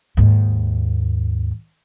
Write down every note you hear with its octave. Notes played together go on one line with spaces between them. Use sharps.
D#2 G#2